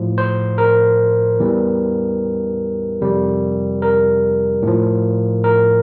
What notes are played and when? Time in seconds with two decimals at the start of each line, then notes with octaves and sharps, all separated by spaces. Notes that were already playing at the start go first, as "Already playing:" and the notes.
Already playing: A2 F3
0.18 C5
0.58 A#4
1.39 E2 E3 G3
3.01 F2 C3 G3
3.82 A#4
4.62 A2 F3
5.44 A#4